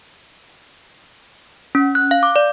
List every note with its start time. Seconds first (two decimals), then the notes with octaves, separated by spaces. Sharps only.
1.75 C#4
1.95 F#6
2.11 F5
2.23 D6
2.36 D5